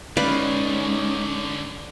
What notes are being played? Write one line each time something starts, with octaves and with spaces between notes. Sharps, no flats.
D3 G3 G#3 C#4 D#4 B4 D5 F5